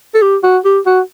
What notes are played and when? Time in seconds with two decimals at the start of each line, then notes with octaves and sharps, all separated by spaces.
0.15 A4
0.22 G4
0.43 F#4
0.64 G4
0.86 F#4